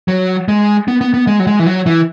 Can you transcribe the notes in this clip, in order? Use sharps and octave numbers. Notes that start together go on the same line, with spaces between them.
F#3
G#3
B3
B3
B3
G#3
F#3
G#3
E3
F#3
E3